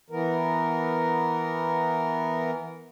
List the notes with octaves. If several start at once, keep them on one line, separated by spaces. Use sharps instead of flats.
E3 B3 A#4